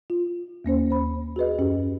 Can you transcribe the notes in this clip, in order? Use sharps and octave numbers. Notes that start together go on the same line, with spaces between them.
F4
D#2 A#3 C#4 C5
C5 B5
F#4 G#4 B4 D#5
F#2 C#4 G4